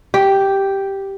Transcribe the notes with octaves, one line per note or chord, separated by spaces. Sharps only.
G4